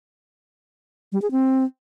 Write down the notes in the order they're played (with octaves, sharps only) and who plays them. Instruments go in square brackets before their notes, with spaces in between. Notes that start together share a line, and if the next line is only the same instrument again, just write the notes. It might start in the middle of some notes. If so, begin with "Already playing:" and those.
[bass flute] G3
G#4
C4